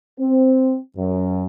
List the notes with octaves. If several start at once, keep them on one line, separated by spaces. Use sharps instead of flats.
C4
F#2